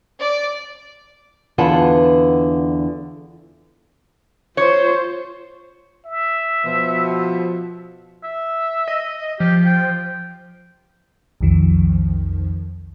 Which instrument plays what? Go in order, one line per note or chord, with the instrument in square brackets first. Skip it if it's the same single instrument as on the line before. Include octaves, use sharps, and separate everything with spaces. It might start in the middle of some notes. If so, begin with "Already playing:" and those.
[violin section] D5
[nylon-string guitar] E2 D3 F4 B4 F#5 A5
[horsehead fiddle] F4 C5 [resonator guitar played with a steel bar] C#5
[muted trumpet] E5
[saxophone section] B2 F3
[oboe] E5
[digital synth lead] D#5
[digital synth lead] F3 [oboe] G4
[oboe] G5
[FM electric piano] B1 F2 D#3 F3